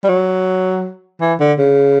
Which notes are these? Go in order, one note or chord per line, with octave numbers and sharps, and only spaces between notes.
G3
F#3
E3
D3
C#3